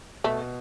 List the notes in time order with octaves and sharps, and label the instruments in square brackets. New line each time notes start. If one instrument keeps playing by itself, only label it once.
[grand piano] B2 [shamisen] A3